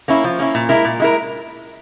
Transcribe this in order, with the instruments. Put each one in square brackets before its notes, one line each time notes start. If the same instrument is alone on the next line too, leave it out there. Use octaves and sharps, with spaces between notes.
[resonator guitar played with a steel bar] A#3 C#4 E4
F3
A#3 C#4 E4
A#2
G#3 E4 A#4
A#2
G#3 E4 A#4